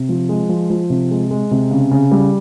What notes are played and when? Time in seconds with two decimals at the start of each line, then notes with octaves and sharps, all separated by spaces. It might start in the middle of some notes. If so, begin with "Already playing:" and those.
Already playing: C3
0.09 F3
0.29 G#3
0.49 F3
0.70 F3
0.90 C3
1.11 G#3
1.31 G#3
1.51 C3
1.71 C#3
1.91 C#3
2.11 G3